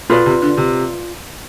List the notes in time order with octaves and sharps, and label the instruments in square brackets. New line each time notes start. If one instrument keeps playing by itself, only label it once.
[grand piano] B2 [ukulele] F4 B4 D5
[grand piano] C3
D3
C3